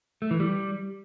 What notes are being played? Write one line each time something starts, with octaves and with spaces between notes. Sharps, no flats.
A3
E3
G3